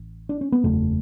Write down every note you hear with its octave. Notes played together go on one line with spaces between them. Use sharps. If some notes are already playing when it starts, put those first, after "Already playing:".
Already playing: A1
D4
C#4
B3
F#1 E2 C#3 A3